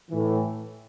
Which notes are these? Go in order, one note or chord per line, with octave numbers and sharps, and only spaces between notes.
A2 E3